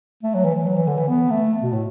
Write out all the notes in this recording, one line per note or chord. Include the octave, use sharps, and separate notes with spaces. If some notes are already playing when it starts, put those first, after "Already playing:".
A3
F#3
E3
E3
F#3
E3
D3
E3
B3
A3
B2
A2